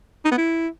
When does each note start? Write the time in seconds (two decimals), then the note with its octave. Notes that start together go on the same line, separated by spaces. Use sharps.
0.24 D#4
0.31 B3
0.38 E4